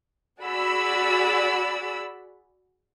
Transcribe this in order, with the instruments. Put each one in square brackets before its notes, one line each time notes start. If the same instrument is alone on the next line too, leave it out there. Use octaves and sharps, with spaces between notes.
[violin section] F#4 G#4 D5 F#5 B5 E6